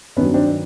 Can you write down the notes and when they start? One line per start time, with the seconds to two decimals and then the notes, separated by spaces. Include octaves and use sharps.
0.16 G2 D#3 F#3 B3 C#4
0.34 C4 D4